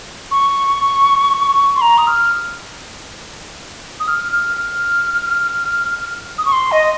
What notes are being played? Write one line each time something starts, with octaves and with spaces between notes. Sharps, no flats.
C#6
C6
A#5
D#6
F6
D#6
F6
F6
F6
D#6
C#6
C6
D#5